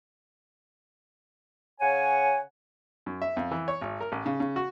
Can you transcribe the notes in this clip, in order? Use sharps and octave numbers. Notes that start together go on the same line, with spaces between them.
C#3 C#5 F#5 G#5
F#2
E5
F2
E3
C#5
G#1
A#4
A1
C#3
C#3
F#4